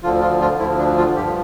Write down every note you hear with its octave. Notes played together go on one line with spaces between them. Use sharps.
D2 D3 F3 F4
F4
F4
D2 D3 F3 E4
D4
F4
G2 F3 G4